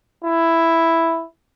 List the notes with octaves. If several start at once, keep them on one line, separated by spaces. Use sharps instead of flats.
E4